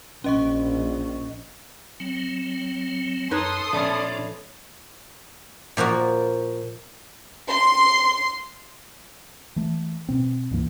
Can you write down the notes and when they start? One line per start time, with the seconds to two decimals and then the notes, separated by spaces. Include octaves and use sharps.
0.24 A#1 C#4 D#5 C#6
2.00 F#3 C4
3.31 F#2 D#4 A4 B4 C#5 C6 D#6
3.73 A#2 F3 A3 B3 C#4 D4 D5
5.77 A#2 F3 A#3 F#4
7.49 C6
9.56 E3 A3
10.09 B2 C4
10.51 C#2 G2 E3 A#3